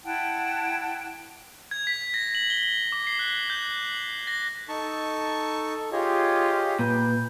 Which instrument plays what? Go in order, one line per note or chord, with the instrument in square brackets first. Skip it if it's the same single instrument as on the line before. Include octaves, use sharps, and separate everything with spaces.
[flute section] E4 F#5 G5 A5
[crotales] G#6
B6
A#6
F#7
G7
D6
C7
F#6
G6
F#7
A#6
[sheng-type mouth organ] D#4 A5 C#6 [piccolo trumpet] A4
[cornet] F4 [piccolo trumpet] G4 [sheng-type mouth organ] G#4 C#5 D#5
[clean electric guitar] A#2 [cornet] B4 [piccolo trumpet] G6